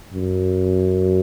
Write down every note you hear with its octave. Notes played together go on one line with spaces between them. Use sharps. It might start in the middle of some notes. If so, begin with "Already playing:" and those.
F#2